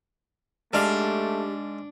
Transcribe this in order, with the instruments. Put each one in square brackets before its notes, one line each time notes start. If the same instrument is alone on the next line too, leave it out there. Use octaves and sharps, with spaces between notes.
[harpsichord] G#2 F5 [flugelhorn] A3 [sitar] D4 [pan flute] G4